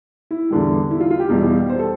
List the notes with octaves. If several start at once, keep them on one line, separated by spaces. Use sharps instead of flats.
E4
E2 D3 G3
E4
F4
F4
G4
E2 B2 G3
C5
A4